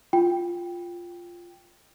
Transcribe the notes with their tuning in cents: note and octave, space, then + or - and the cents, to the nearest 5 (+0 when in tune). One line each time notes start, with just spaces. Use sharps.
F4 +0 G5 +0